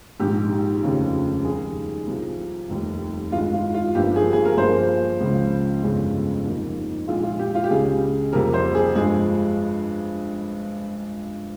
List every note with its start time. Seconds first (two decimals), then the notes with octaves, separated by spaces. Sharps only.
0.20 A#1 G#2 D#3 G4
0.82 F1 D#2 C#3 F3
1.45 F2 D#3 G3 G#4
2.08 C2 C3 F3
2.70 F1 D#2 D#3 G3
3.32 G2 D#3 G#3 F4
3.53 F4
3.74 F4
3.95 G1 G2 F3 A#3 G4
4.16 G#4
4.33 G#4
4.45 A#4
4.57 G2 F3 A#3 C5
5.20 C#2 C#3 F3
5.83 G1 F2 C#3 F3 G#3
6.45 F2 C3 D#3 A#3
7.07 A#1 A#2 G#3 F4
7.23 F4
7.39 G4
7.55 F4
7.64 G4
7.70 C#2 C#3 G#3 G#4
8.33 F2 C3 G3 A#3 A#4
8.54 C5
8.75 G#4
8.95 G2 F3 G#3 G#4